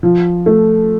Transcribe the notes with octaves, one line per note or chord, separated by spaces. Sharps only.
F3
A3